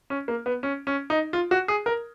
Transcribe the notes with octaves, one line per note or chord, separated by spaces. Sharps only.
C#4
A#3
B3
C#4
C#4
D#4
F4
F#4
G#4
A#4